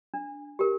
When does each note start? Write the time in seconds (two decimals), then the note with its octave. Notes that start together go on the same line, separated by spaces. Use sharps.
0.14 D4
0.59 G4 A#4